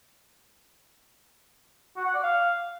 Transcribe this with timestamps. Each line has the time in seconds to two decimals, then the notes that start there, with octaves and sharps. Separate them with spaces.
1.96 F#4
2.05 F#5
2.14 D5
2.23 F5